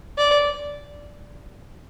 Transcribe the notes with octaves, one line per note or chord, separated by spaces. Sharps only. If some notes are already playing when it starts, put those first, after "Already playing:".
D5